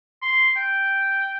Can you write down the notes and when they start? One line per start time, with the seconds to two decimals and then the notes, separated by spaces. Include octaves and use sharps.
0.22 C6
0.56 G5